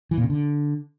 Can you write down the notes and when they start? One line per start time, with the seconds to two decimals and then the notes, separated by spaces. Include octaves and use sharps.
0.11 E3
0.17 A#2
0.24 C#3
0.30 D3